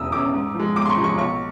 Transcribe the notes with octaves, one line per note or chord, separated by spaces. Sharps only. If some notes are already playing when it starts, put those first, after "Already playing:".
Already playing: E1 E2 C#3 D#6 E6
E2 C#3 D6
G#2
F3
G#3
G#2 D6
C6
C#6
F3
G#3 C#6
B1 C#6